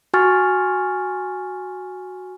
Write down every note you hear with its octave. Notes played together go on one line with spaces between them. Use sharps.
F#4 G#5 C#6 F6 A6